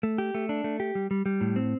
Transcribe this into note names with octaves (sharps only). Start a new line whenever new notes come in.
A3
G4
A3
D4
A3
G4
G3
G3
G3
A2
C4